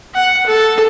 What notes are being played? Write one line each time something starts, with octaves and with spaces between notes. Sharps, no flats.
F#5
A4